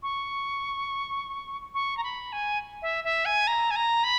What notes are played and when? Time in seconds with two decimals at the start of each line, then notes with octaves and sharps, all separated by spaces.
0.03 C#6
1.74 C#6
1.97 A#5
2.04 B5
2.32 G#5
2.82 E5
3.04 E5
3.25 G#5
3.47 A#5
3.71 G#5
3.76 A#5
4.04 B5